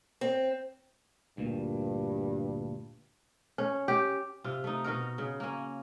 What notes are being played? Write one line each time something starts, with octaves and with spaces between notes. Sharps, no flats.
C4
D2 G2 A#2
C#4
G4
C3 F4
A3 D#4
B2 D#4 F#4 A#4
C#3
A#3 C#4